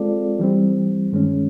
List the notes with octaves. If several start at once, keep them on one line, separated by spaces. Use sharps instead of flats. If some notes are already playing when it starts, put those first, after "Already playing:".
Already playing: G#3 C4 F4 A4 D5
E3 G3 C4
G2 D#3 G#3 C#4